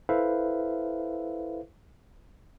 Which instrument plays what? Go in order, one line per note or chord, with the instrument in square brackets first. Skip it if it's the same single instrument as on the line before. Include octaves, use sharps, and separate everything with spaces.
[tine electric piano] E4 A4 B4 C5 E5 F5